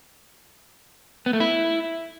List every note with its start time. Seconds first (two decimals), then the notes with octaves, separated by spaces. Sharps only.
1.26 B3
1.33 A3
1.40 E4